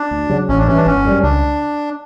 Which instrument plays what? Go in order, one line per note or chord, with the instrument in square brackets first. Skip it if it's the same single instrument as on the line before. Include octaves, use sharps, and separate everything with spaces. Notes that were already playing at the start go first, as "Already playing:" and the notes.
Already playing: [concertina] D4
[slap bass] D2
C#3 F#3
[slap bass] A1 [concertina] C#4
[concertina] D4
[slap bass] G2 E3 [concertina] C#4
[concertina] D4
[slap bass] G1 [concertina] C#4
[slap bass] F#2 D3 G3
[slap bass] C#2 [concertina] D4